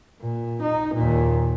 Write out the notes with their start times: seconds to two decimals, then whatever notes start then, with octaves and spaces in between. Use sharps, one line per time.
0.21 A#2
0.62 D#4
0.95 D#2 A#2